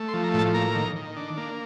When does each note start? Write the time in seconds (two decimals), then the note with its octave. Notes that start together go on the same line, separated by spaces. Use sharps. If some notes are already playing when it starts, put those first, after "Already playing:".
Already playing: A3
0.08 C6
0.14 F3
0.24 A#5
0.34 A2 A5
0.54 A#3 A#5
0.75 D#3
0.96 D#3
1.16 D4
1.37 A#3